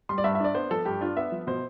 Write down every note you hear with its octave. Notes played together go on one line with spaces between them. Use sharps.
G3 C6
D5
G2 E5
E5
D4 D5
B3 C5
F3 A4
G2 G4
D4 F4
B3 E5
F3
B2 C5